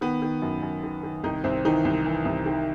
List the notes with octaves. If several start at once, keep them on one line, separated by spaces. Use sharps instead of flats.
D#3 B3
D#3
F#2
F#2
D#3
D#3
C2 D#3 D#4
C2 C4
D#3 E3 D#4
C2
E3
C2
D#3